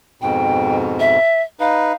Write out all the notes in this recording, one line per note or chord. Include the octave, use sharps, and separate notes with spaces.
F2 G#2 B2 G5
E5
D#4 B4 F5